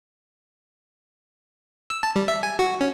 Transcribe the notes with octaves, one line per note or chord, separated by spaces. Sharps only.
E6
A5
G3
E5
G#5
F#4
C#4